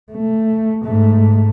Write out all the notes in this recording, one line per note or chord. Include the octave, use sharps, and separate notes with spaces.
A3
G#2 A3